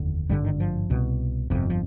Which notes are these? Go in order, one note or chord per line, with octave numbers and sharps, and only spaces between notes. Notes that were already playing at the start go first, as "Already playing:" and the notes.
Already playing: F1 D#2 D3
G#1 G2 D3 G3
D#3
F3
C2 B2
G1 F2 C3
F3